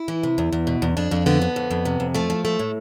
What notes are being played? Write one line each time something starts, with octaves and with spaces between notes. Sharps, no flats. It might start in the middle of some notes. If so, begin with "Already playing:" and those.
Already playing: E4
E3
C3
E2
E2
B2
E2
F2 D4
F2
D3 B3
D3
F2
F2
C3
F2
F3 A3
F3
A3
A2